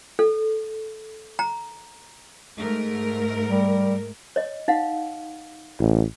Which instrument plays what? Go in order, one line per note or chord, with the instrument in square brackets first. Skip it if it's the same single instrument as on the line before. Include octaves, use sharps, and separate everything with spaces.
[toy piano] A4
A#5
[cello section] G#2 A3 A#4
[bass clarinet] G3
[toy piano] C#5 D#5
D#4 F5 F#5
[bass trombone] A1